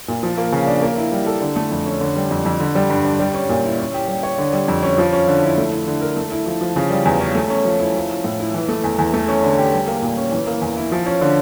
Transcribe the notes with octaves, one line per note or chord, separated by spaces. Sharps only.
A#2
F3
A#3
C#3
D4
A#3
E4
G3
A4
D3
A3
F2
C#4
D3
G3
F2
F2
D3
G3
G2
D4
G3
C#4
A#2
E4
C#4
G4
G3
C#5
D3
G3
F2
C#4
F3
C#4
D3
E4
A3
E4
D3
A#4
A3
E4
F3
F3
C#3
G3
E2
C#4
A3
C#4
F3
E4
F3
C#4
A2
E4
E3
A3
E2
E2
A3
C#4
D3
G4
G3
A#3
A#2
C#4
E3
A#3
E2
E4
F3
C#4
D3